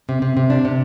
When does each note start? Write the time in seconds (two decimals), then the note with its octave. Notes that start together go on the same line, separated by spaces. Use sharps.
0.09 C3
0.22 C3
0.37 C3
0.50 D4
0.65 C3